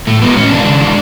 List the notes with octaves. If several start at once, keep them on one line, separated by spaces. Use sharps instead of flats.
A2 A3
E3 G#3 B3
A2 C#4
E3 G#3 D4
C#3
E3 G#3